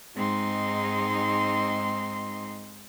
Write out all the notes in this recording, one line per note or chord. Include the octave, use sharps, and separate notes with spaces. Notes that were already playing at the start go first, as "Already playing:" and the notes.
G#2 G#3 C4 D#4 C6